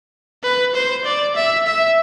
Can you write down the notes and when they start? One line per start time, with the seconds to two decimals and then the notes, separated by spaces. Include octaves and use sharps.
0.43 B4
0.74 C5
1.05 D5
1.35 E5
1.66 E5